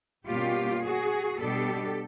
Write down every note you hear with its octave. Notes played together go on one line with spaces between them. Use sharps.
B2 G3 A#3 C#4 F4 G4
F#4 G#4
B2 G3 B3 D4 G4 A4